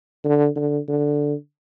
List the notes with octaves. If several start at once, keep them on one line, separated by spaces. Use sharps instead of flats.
D3
D3
D3